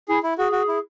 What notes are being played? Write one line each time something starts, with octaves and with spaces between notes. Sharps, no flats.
E4 G#4
E4
F#4 G#4
F#4
E4